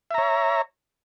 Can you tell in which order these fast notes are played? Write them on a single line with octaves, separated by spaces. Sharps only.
E5 A#5 C#5